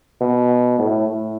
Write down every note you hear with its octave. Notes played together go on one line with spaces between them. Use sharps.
B2
A2
A2